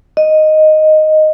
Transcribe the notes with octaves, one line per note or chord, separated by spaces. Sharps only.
D#5